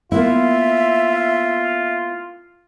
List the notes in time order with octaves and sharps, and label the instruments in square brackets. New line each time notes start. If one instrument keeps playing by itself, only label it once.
[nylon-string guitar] A#3 B3 E4 [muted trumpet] F4 [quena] E5